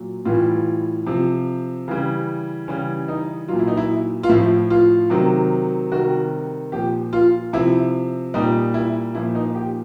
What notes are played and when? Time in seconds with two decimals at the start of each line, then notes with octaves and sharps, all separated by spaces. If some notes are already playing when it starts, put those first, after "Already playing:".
Already playing: A#2 F#3
0.25 A2 E3 G3 F4
1.07 C3 F3
1.88 C#3 E3 G3
2.68 C#3 E3 G3 C#4
3.08 D#4
3.48 F#3 F4
3.53 A#2
3.59 E4
3.68 D#4
3.77 E4
4.23 F4
4.29 A2 F3 E4
4.70 F4
5.10 C3 D#3 F#3
5.91 C3 D#3 G3 F#4
6.72 A#2 F3 G4
7.13 F4
7.53 C3 F3 E4
8.34 A#2 G3 D#4
8.74 E4
9.15 A#2 F3 E4
9.35 D#4
9.55 G4